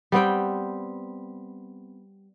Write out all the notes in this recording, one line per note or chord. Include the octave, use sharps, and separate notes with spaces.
G3 B3 C4 G5